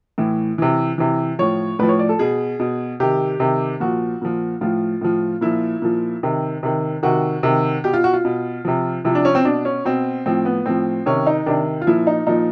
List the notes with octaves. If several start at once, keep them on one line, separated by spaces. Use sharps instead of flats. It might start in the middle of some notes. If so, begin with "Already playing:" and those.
A2 E3
C3 E3
C3 E3
A2 F3 C#5
A2 F3 B4
C#5
D5
A4
B2 G#4
B2
C3 D#3 G4
C3 D#3
A#2 F3 F#4
A#2 F3
A2 F3 F4
A2 F3
A#2 F3 E4
A#2 F3
C3 D#3
C3 D#3
C3 D#3 F#4
C3 D#3
B2 G4
F4
F#4
F4
B2
C3 F3
C3 F3 E4
D4
C#4
C4
B2 D4
C#4
B2 C4
A2 F3 C4
B3
A2 F3 C4
C3 D#3 C#4
D#4
C3 D#3 D4
F4
A#2 F3 E4
D#4
A#2 F3 D#4